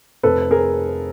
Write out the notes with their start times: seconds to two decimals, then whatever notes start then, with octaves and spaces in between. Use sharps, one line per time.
0.23 F1 A4 B4
0.51 G#4 A#4